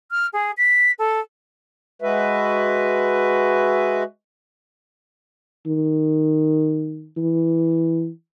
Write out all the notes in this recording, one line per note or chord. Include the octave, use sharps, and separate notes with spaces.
F6
G#4
B6
A4
G#3 F#4 B4 E5
D#3
E3